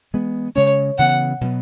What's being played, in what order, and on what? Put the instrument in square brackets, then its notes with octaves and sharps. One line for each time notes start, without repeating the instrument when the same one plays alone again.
[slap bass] E3 G#3 B3
[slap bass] C#3 G#3 C#4 [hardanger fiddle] C#5
[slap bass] C#3 E3 B3 [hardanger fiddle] F#5
[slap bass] B2 F#3 B3